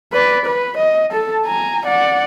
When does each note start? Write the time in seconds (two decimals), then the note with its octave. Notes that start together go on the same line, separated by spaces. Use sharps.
0.13 B4 D5
0.46 B4
0.77 D#5
1.11 A4 A5
1.45 G#5 A#5
1.86 D5 F#5